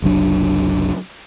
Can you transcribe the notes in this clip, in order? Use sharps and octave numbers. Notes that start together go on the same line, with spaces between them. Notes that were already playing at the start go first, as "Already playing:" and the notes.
F#1 C2 F#3 D4